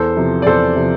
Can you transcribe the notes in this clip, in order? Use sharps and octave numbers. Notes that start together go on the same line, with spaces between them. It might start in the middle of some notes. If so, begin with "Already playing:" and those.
Already playing: E2 A4 C5
C3 F3
D5
E2 A4 C5
C3 F3